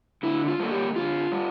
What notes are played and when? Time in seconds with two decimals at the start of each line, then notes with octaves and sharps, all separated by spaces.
0.23 D3 E4
0.48 F4
0.60 G3 A#3 A4
0.71 G4
0.96 D3 F4
1.32 G3